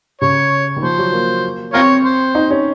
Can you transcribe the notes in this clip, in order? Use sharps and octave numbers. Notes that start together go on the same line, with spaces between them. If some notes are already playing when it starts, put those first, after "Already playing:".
C#3 C#5
D#3
F3 C5
F#3
A#3
C4 F4 A#4 C#5
C5
D#4
C#4